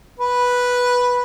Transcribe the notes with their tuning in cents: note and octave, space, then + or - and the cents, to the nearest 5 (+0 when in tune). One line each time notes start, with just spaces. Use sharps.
B4 -5